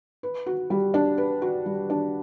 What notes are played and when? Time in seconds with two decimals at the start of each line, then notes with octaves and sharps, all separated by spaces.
0.23 B4
0.46 F#4
0.70 G3
0.94 D4
1.18 B4
1.42 F#4
1.66 G3
1.90 D4